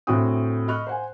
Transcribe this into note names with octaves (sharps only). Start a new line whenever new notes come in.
D2 A2 C4 F#4 G5 D#6
D#5 B5 C#6 F6 F#6
C5 F#5 G#5